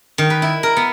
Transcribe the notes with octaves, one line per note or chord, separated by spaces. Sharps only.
D#3
B4
E4
A#4
B3